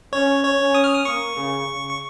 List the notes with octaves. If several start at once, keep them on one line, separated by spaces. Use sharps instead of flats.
C#4 C#5
C#5
C#4
D#6
F6
D#6
A#3 C#6
C#3
C#3
C#6